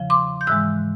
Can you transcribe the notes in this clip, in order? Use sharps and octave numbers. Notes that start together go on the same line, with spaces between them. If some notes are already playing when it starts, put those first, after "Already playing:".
Already playing: E2 C#3 F3
C6 D6
G6
G#2 E3 G#3 E6 F#6